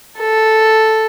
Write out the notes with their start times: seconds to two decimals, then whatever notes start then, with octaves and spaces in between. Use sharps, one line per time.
0.18 A4